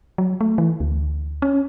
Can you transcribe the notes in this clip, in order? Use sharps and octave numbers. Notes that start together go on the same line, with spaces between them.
F#3
A3
E3
D2
C#4